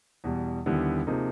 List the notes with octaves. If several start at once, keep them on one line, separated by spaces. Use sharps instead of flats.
E2 B2 G3
D#2 D3 G3 B3 E4
C3 F3 A#3 D#4 G#4